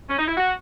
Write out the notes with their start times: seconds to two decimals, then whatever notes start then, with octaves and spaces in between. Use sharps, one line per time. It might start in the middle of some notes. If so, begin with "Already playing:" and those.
0.09 C#4
0.18 D#4
0.27 E4
0.37 F#4